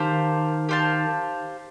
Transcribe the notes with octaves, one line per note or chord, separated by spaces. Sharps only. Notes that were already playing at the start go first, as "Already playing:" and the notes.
Already playing: D#3 G4 C5 F5 A5
G4 C5 F5 A5